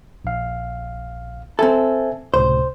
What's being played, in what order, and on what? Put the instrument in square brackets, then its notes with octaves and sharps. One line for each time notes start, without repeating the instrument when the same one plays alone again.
[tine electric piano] A#1 F5
[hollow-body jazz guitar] C4 A4 [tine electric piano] E5 G#5
[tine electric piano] C#2 A2 C3 [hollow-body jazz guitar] C5